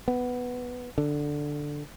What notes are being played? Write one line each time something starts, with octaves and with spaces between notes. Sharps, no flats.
B3
D3